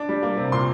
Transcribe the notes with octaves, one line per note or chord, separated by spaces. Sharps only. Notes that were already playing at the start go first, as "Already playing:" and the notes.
Already playing: D4 D6
G3
A#3
C3
A#2 C6